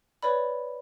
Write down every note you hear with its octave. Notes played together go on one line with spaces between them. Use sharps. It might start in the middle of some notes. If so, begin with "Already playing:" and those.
B4 C#5 D5 B5